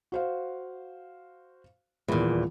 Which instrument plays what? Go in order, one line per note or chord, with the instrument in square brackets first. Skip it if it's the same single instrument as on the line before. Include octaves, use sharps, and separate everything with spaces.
[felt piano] F#4 C5 F5
[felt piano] D#1 E3 [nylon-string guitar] E2 A#2